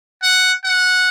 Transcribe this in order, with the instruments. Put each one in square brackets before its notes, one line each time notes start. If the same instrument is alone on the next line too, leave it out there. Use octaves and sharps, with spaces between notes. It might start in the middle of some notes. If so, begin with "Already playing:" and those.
[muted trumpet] F#5
F#5